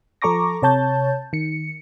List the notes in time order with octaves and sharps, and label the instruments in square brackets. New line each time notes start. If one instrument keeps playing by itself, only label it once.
[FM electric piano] F3 A4 A#5 C#6 D6 A#6
C3 C#5 A5 G6 A6
D#3 C#7